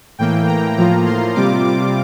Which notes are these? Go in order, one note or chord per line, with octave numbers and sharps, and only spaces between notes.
A2 E3 A#3 G5
A#5
A2 F3 A#3 F4 A#5
C6
C3 G3 C4 F4 D6
D6